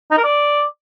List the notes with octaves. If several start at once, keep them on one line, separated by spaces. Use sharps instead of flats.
D#4
A#4
D5